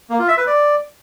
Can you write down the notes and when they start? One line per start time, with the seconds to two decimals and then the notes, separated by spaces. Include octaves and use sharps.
0.10 A#3
0.19 F4
0.28 E5
0.37 B4
0.47 D5